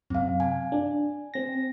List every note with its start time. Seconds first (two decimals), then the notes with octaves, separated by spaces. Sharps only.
0.10 F#2 C3 C4 F5
0.40 G#5
0.72 D4
1.34 C4 A#6